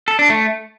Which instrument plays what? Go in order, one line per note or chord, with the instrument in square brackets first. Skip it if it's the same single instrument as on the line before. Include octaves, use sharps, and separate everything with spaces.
[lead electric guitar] A4
D4
A3